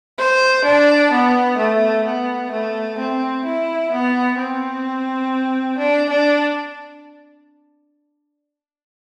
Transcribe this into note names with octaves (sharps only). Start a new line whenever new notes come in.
C5
D4
B3
A3
B3
A3
C4
E4
B3
C4
D4
D4